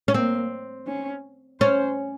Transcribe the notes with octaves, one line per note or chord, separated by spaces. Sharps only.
C#4
A#3 C4
C#4
C#4 C5